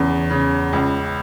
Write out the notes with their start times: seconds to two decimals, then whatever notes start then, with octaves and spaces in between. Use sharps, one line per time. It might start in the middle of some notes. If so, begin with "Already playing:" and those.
Already playing: E2 C#3
0.30 C#3
0.73 C#2